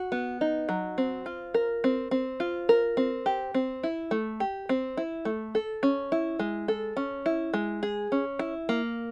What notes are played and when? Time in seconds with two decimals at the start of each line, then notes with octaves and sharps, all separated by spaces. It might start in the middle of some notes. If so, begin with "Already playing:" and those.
Already playing: F#4
0.12 B3
0.41 D#4
0.69 F#3
0.98 C4
1.26 F4
1.54 A#4
1.84 C4
2.11 C4
2.40 F4
2.69 A#4
2.97 C4
3.26 G4
3.54 C4
3.83 E4
4.11 A3
4.40 G4
4.69 C4
4.97 E4
5.25 A3
5.55 A4
5.83 C#4
6.12 E4
6.39 G#3
6.68 A4
6.97 C#4
7.26 E4
7.54 G#3
7.83 G#4
8.12 C#4
8.39 E4
8.69 A#3